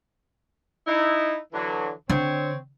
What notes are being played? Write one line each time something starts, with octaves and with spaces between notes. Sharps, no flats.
D#4 E4
D3 E3 F#3
D3 C4 C#5